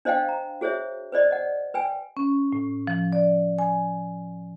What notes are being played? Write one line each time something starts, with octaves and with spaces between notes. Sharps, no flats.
D4 C5 D#5 F5 G5
A#5
F#4 G#4 C5 C#5 E5
B4 C5 D5 D#5
D#5 F#5
B4 G5 G#5
C#4
A2
F3
D5
G#5